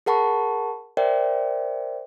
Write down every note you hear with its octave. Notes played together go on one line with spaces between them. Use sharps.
G#4 A#4 F#5 A5 B5 C#6
A#4 C5 D5 E5 G5